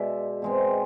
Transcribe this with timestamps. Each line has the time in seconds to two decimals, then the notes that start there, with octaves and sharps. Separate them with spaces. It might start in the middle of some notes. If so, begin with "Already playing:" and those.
Already playing: B2 G#3 D5 E5
0.42 B2 G#3 C4